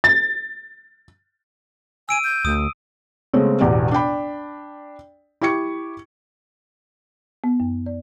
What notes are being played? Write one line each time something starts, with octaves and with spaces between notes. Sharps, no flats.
A6
G#5 E6 D7 D#7
G6
D2 D#6
C#3 G#3 A3 B3 C4
E1 A1 E2 G4 D5
D4 D5 G5 B5
E4 G4 G5 C#6 G#6 C#7
B3
F#2
D5